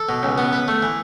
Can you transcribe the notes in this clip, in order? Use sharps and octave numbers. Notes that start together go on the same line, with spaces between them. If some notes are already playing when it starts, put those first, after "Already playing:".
Already playing: A4
B2
C#2
B3
B4
A3
E3